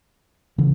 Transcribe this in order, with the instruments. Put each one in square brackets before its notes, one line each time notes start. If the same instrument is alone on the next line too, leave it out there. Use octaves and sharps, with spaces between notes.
[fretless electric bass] C#3 E3